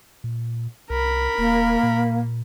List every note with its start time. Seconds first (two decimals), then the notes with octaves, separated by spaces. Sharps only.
0.24 A#2
0.90 C2 A#4 B5
1.38 D#1 A#3
1.83 A#2